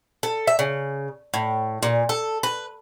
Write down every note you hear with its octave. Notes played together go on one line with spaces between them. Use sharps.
A4
E5
C#3
A2
A#2
A4
B4